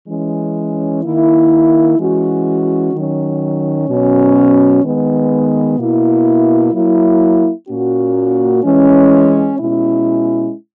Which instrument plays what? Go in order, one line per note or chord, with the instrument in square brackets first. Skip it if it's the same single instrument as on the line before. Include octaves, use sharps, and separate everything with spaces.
[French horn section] E3 G#3 C#4
D#3 A#3 E4
E3 G#3 C#4 F#4
D#3 F#3 C#4
B2 F#3 C#4
D#3 G#3 B3
B2 A#3 E4
F#3 A#3 E4
A#2 A#3 C#4 F#4
E3 G#3 C#4
B2 G#3 C#4 E4